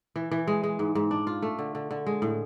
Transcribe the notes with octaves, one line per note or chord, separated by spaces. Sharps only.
E3
E3
G#3
G#3
G#2
G#2
D4
F4
A3
D3
D3
D3
G#3
A2